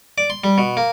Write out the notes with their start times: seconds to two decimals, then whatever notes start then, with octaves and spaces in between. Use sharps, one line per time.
0.18 D5
0.30 C6
0.44 G3
0.58 B2
0.77 A#3